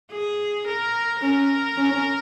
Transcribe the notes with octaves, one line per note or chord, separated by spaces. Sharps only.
G#4
A#4
C#4 A#4
C#4